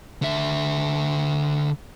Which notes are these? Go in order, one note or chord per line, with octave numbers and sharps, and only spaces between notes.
D3 E5